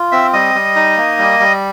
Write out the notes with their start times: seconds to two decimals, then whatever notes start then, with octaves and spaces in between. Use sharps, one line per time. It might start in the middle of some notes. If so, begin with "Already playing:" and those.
Already playing: F4
0.12 C4 E5 E6
0.33 G3 D#5 D#6
0.55 G3
0.76 D#4
0.97 A#3
1.19 G3
1.40 G3